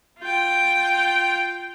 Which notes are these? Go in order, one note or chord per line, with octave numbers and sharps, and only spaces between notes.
F4 G5